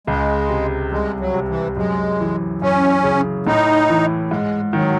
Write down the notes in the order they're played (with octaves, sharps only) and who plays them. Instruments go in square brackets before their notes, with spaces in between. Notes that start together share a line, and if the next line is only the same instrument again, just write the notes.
[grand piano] C#2 [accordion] G#3
[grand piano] C3
[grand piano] C2 [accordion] G#3
[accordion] F#3
[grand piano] C3
[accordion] E3
[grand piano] F#2 [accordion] G#3
[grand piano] E3
[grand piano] F#2 [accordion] C#4
[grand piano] C#3
[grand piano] A2 [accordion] D#4
[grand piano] E3
[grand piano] G#2 [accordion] G#3
[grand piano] D#3 [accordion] F#3